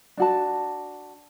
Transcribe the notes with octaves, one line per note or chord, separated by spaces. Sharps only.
D4 F#4 A5